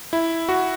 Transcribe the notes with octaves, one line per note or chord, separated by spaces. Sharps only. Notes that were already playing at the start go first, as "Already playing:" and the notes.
E4
F#4